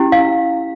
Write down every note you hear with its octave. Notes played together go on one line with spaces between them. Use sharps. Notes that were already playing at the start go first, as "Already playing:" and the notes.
Already playing: C#4 E4 G4
F5